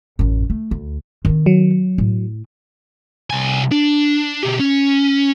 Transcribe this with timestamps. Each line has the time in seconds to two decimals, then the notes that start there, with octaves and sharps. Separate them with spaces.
0.19 A1 F#2
0.50 A3
0.71 D2
1.25 D#3 C4
1.46 F#3
1.98 A2
3.30 C2 G#5
3.71 D4
4.43 B2 G4
4.59 C#4